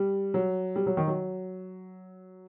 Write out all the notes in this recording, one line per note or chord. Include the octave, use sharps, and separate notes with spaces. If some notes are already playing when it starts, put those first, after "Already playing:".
Already playing: G3
F#3
G3
F#3
D#3
F#3